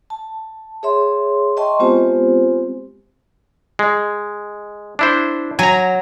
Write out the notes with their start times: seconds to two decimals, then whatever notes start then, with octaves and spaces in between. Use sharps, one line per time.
0.10 A5
0.83 G#4 C#5 E5 C6
1.57 D#5 E5 G5 A5 C6 C#6
1.79 G#3 B3 C4 F4 G4 C5
3.79 G#3
4.99 D4 E4 C5
5.59 F#3 G#5 A#5